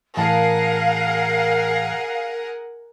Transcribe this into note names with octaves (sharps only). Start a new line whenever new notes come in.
A2 E3 G#4 A#4 F5 F#5 A5